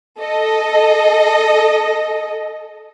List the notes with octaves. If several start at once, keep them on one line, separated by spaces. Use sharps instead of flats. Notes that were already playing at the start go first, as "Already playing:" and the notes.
A4 D#5